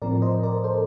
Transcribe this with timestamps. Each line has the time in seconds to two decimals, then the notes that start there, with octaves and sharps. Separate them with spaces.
0.02 A2 F3 C4 A#4 D5
0.22 C5 D#5
0.43 A#4 D5
0.64 A4 C5